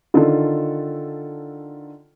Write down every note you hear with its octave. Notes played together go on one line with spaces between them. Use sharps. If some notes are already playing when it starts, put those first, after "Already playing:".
D3 D#3 F4 A4